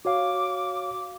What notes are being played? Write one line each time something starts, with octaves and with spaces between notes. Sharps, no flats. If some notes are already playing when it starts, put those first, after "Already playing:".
F#4 C#5 F5 D6